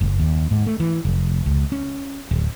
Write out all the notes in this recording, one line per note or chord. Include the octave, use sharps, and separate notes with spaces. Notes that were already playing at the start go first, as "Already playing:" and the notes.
F#1
D#2
G#2
A3
E3
F1
C#2
C#4
D1